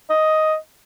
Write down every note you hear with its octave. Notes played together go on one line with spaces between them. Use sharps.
D#5